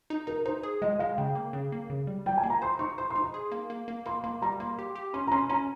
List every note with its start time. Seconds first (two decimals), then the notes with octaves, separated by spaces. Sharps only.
0.10 D#4
0.27 D#4 A#4
0.46 D#4 C5
0.63 G#4
0.82 G#3 D#5
0.99 G#3 F5
1.17 C#3 G5
1.35 A#3
1.53 C#3
1.72 A#3
1.90 C#3
2.07 G3
2.26 G3 G5
2.38 G#5
2.43 A#3
2.50 A#5
2.62 C5 C6
2.79 D#4 C#6
2.98 C5 C6
3.10 C6
3.16 D#4
3.22 C6
3.34 G#4
3.52 A#3
3.70 A#3
3.88 A#3
4.06 A#3 C6
4.24 A#3 C6
4.42 G3 A#5
4.60 A#3 C6
4.79 G4
4.96 G4
5.14 C#4 C6
5.27 A#5
5.31 C#4 C6
5.49 C#4 A#5